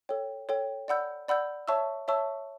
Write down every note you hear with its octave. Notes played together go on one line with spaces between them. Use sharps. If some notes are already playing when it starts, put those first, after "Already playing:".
A4 C#5 G5
A4 C#5 G5
D5 F#5 B5 E6 G6
D5 F#5 B5 E6 G6
C#5 E5 A5 C#6 E6
C#5 E5 A5 C#6 E6